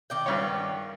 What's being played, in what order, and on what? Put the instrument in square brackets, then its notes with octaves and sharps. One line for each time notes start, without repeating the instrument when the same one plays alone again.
[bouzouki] D#3 D5 G5
[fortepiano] G#1 G2 C#5